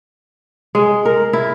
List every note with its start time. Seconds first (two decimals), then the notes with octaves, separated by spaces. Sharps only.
0.75 G#3
1.05 A#4
1.33 E4